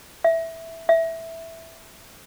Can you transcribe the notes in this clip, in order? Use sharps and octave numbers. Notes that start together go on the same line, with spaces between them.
E5
E5